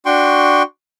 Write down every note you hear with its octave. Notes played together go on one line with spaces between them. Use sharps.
D4 F#4 G5 C6 C#6